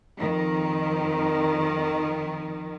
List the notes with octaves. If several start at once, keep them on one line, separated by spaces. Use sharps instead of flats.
F2 D#3